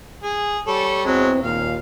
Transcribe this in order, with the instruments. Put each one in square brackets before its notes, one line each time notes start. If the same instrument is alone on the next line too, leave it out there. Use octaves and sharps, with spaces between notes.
[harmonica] G#4
G3 A4 C#5
[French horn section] E2 C4 [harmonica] F#3 G#3
[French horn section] D#2 A#2 [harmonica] F5